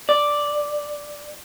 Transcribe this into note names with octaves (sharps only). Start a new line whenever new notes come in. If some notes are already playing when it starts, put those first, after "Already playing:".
D5